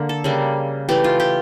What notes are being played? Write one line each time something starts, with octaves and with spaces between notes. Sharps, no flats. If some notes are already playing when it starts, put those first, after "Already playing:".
Already playing: D3 A#3
A4
C#3 G3 A#3
E3 A3 G4
F4
G4